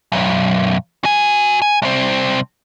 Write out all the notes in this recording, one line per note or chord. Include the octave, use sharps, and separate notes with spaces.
B1 F#2
F#4 G#5
G#5
C2 C4